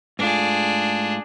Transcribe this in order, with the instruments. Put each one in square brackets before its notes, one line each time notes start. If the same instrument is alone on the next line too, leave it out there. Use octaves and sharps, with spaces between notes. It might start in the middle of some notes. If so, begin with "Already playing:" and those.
[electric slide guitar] G#2 A3 F4 [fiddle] D4 G#4